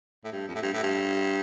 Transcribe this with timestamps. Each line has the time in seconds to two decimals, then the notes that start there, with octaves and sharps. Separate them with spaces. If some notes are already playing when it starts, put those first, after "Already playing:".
0.24 A2
0.32 G2
0.47 F2
0.55 A2
0.62 G2
0.73 A2
0.83 G2